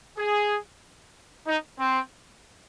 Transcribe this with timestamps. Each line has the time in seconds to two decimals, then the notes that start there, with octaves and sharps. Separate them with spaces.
0.18 G#4
1.47 D#4
1.79 C4